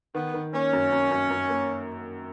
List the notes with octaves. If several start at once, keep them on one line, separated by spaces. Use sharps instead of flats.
D#3 B3
D#3
A#3 C#4
F#2
F#2
F#2
F#2
A#3